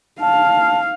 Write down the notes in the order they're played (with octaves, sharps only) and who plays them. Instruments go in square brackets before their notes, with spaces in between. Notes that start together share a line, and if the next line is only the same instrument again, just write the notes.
[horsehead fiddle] F5 [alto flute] A5